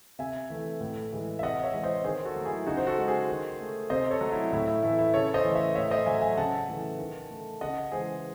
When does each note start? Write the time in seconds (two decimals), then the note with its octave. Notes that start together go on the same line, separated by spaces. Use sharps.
0.19 C3 E5 G#5
0.50 E3 A3
0.81 A2
1.13 E3 G#3
1.39 E5
1.43 C3 D#5 F#5
1.63 C#5 E5
1.74 E3 G#3
1.84 C5 D#5
2.04 D#3 G#4 C5
2.25 F#4 A4
2.36 F#3 A3
2.45 E4 G#4
2.66 C#3 D#4 F#4
2.77 C5
2.87 F#4 A4
2.98 G#3
3.08 G#4 C5
3.28 D#3
3.60 A3
3.90 C3 C5 D#5
4.11 A4 C#5
4.21 F#3 A3
4.32 E4
4.52 A2 E4
4.67 E4
4.83 E3 A3 E4
4.99 E4
5.13 C#3 A4 C#5
5.34 C5 D#5
5.45 E3 A3
5.55 C#5 E5
5.75 A2 C#5 E5
5.91 C5 D#5
6.06 F#3 A3 E5 G#5
6.22 E5 G#5
6.37 C#3 F#5 A5
6.68 E3 A3
6.99 D#3
7.30 A3
7.61 C#3 D#5 F#5
7.92 E3 G#3 G#4 C5